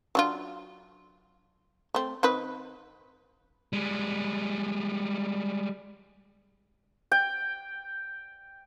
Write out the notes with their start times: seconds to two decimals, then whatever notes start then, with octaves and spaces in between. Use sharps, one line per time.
0.15 F#3 D4 F4
1.94 A3 C4
2.23 D#3 C4 B4
3.73 G3 G#3
7.12 G5